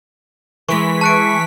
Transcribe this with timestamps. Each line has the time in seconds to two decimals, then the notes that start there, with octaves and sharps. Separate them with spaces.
0.69 E3 G#3 A#4 B4 C#6 B6
1.01 A5 C#6 F#6 D7